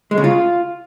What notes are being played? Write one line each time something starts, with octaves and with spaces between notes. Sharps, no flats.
G#3
C#3
F4